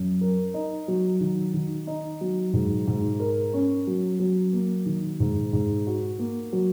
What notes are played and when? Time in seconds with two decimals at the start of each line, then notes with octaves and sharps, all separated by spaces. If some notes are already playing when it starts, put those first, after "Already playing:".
Already playing: F#2
0.21 A#4
0.54 D#4
0.88 F#3
1.20 D#3
1.54 D#3
1.87 D#4
2.21 F#3
2.53 G#2
2.87 G#2
3.20 A#4
3.53 C#4
3.87 F#3
4.20 F#3
4.53 A#3
4.86 D#3
5.20 G#2
5.53 G#2
5.87 F#4
6.19 A#3
6.53 F#3